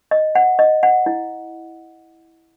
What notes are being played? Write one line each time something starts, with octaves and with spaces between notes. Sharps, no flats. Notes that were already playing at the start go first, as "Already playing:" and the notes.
D#5
F#5
D#5
F#5
E4